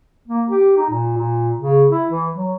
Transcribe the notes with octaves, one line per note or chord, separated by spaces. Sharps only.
A#3
G4
D#4
A#2
A#2
C#3
E4
E3
F#3